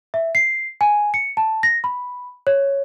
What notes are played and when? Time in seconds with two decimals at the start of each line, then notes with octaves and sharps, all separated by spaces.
0.14 E5
0.35 C7
0.81 G#5
1.14 C#7
1.37 A5
1.63 A#6
1.84 B5
2.47 C#5